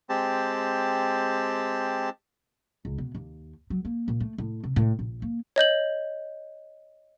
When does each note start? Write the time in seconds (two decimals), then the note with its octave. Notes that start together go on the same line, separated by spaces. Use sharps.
0.09 G#3 C4 G4 A5
2.85 C#2
2.98 B2
3.15 D#2
3.70 F#3
3.85 A#3
4.08 A#2
4.20 A3
4.38 A2
4.64 C3
4.76 A2
4.99 A#1
5.22 A#3
5.56 C#5 D#5 G6 F#7